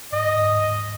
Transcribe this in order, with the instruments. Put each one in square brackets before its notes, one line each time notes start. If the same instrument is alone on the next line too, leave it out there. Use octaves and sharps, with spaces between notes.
[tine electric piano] G#2 [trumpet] D#5
[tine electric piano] G#2
G#2
G#2